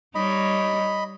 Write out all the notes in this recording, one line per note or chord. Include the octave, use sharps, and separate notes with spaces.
G3 D#4 C#5 D#5 B5